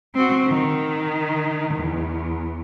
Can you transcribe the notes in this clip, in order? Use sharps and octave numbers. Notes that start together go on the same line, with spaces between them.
C4 F#4
D#3
E2